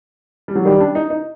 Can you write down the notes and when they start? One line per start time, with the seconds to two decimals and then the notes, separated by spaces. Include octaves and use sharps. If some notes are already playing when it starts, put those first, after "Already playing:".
0.48 G3
0.55 F#3
0.65 D#3 G3
0.80 D4
0.95 D#4
1.10 D#4